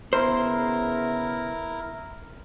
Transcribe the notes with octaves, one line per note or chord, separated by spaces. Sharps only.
C#3 B3 E4 A#4 C5